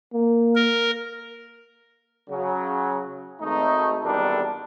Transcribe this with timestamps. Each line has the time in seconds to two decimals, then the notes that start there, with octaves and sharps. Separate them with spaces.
0.14 A#3
0.56 A#4
2.30 C#3 F#3
3.41 G#1 A3 D#4
4.05 G#1 E2 G3 D4 A4 A#4